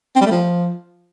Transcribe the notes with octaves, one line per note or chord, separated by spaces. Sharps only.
C4
G3
A3
F3